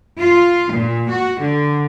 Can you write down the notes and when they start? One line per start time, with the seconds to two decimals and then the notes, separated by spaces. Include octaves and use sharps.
0.17 F4
0.71 A#2
1.10 F#4
1.40 D3